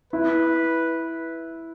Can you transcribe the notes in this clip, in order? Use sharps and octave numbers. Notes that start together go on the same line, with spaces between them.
E4 B4